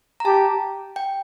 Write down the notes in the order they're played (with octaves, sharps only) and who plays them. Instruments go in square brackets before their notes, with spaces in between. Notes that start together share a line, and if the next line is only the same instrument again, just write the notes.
[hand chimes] A#5
[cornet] G4 [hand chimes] A5
[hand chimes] G5